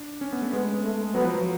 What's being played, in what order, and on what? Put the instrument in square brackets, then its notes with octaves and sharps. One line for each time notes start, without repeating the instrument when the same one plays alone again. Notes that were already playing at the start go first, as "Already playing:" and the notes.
Already playing: [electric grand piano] D4
C#4
B3
A3
[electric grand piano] G#3 [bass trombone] B3
[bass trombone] A3
[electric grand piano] F#3 [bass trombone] B3
[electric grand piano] F3
F#3